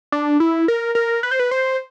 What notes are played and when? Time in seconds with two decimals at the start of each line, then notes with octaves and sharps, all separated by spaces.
0.12 D4
0.40 E4
0.68 A#4
0.95 A#4
1.23 B4
1.31 C5
1.40 B4
1.51 C5